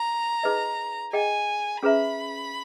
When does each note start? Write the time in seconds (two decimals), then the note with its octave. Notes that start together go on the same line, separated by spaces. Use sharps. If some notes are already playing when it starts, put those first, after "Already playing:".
Already playing: A#5
0.43 D#4 G#4 B4 D#5
1.13 G#4 D#5 G5 G#5
1.83 C#4 G#4 B4 E5 A#5 B5